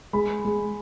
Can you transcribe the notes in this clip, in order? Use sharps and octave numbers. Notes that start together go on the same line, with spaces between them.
G#3 B5
G#3